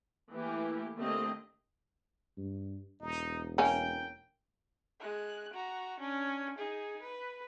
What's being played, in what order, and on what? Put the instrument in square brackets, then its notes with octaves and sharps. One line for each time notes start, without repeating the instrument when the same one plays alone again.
[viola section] E3 A3 A#3 G4
D3 A3 A#3 C4 G4 D#5
[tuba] G2
[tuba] E1 [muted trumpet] D#4
[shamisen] A#3 C#4 D#4 [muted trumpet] G5
[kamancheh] G#3 F#6
F#4 A#5
C#4 D4
D#4 G#4
B4